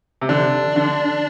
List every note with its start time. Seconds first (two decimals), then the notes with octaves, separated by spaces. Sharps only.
0.21 C3
0.29 D3 D4
0.76 D3